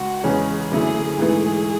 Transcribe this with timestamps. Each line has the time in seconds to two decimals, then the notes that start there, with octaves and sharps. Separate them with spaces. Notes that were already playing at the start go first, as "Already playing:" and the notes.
Already playing: C#2 F#4
0.23 E2 C#3 G#3 C#4 G#4
0.71 F#2 D3 A3 E4 G#4
1.18 G#2 E3 A3 G#4